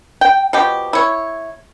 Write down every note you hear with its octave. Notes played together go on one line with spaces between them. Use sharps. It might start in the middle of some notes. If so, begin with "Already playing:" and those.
G5
B2 F3 G4
E4 C#5